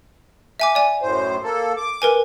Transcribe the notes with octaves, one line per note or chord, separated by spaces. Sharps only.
E5 G#5 D6
D5 G#5
F#2 A2 C5
A#3 A4
D6
A#4 B4 G#5